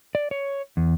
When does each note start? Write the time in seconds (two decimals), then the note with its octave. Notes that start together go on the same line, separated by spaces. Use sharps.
0.15 D5
0.31 C#5
0.77 E2